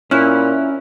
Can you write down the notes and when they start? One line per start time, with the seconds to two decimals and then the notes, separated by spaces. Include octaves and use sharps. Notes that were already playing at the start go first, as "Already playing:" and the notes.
0.11 A#2 C#4 E4 F6 F#6